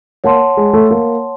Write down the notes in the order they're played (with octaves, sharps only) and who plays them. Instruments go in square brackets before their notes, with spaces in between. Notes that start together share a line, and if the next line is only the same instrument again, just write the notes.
[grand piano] A#3 [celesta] C#5 F#5 A5 C6
[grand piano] G#3
A3
A#3